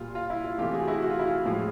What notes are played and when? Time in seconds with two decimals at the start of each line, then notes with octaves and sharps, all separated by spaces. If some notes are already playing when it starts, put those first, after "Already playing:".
Already playing: A#2 G3 F4
0.15 F4
0.30 E4
0.44 F4
0.58 C3 E3 A3 F4 G4
0.73 F#4 G#4
0.88 E4 F#4
1.02 F#4
1.11 F4
1.19 E4
1.27 F4
1.45 A2 F3 G#3